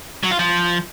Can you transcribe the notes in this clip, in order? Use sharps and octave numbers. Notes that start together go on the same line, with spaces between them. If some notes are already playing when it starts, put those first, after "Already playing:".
F#3
F4
F3